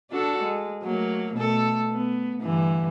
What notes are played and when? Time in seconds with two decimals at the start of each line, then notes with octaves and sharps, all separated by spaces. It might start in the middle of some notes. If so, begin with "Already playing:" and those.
0.11 D4 F#4 A4
0.43 G#3
0.83 F#3 A3 A#3
1.35 B2 A3 A4
1.90 B3
2.42 G2 D3 E3